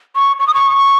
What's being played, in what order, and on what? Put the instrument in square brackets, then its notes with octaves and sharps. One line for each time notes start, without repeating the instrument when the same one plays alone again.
[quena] C#6
C#6
D#6
C#6